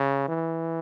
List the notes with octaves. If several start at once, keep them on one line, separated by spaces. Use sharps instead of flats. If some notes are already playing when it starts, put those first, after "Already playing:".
Already playing: C#3
E3